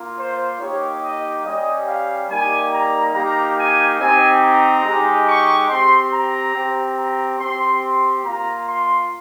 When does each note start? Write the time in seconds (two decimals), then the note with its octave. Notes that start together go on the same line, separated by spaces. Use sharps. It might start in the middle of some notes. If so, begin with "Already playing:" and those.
Already playing: A#3 F4
0.17 C5
0.60 A#3 D#4 G4 C#5
1.02 D#5
1.45 G3 C#4 G4 D#5
1.86 F5
2.30 G3 A#3 D#4 G4 G#5
2.72 A#5
3.14 A#3 D#4 G4 A#5
3.56 G#5
3.99 C4 D#4 G4 G#5
4.42 A#5
4.83 G#3 D#4 G4
5.26 C#6
5.69 C4 G4 C6
6.12 A#5
6.53 C4 G4
6.97 A#5
7.39 C4 G4 C6
7.81 C6
8.24 A#3 F4 A#5
8.65 C6